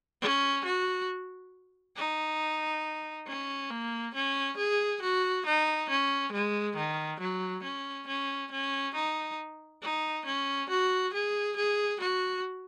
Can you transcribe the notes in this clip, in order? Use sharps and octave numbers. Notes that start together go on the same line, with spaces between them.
C#4
F#4
D#4
C#4
A#3
C#4
G#4
F#4
D#4
C#4
G#3
D#3
F#3
C#4
C#4
C#4
D#4
D#4
C#4
F#4
G#4
G#4
F#4